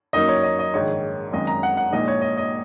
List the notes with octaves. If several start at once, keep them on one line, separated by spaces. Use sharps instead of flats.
F#2 F#3 A#3 D#4 D#5
C#5
D#5
D#5
A#1 G#2 D#3 C#5
G#1 F#2 D#3 G#3 D#5
A#5
F#5
F#5
A#1 A#2 G#3 D#4 D#5
C#5
D#5
D#5